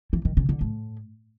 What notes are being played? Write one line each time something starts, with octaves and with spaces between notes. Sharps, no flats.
E3
D#3
C#3
D3
A2